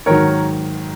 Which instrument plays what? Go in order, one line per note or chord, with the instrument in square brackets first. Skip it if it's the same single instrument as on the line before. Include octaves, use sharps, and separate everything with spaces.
[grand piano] G#2 D#3 F#3 A#4 C#5